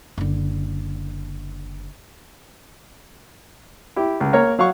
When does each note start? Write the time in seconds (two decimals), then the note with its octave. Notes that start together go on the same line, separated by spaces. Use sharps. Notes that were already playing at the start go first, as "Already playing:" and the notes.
0.18 F#1 D3
3.96 E4 G4
4.20 C#2
4.33 A#3 A#4 C#5
4.59 F#3 F5 F#5 C#6